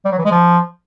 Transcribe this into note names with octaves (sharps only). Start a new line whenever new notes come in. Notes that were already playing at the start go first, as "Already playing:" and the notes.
G3
F#3
E3
G#3
F3